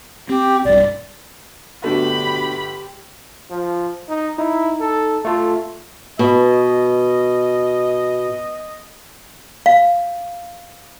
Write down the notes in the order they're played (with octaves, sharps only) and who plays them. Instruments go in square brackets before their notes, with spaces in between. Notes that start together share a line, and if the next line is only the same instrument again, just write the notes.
[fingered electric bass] C4 [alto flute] G4
[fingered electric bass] B1 G2 [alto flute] D5
[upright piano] G1 A3 [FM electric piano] B2 D3 F#3 [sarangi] G4 [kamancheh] B5
[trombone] F3
D#4
[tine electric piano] D#4 [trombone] E4
[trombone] A4
[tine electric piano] A3 F4 [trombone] A4
[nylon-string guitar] B2 [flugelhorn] D#5
[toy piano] F5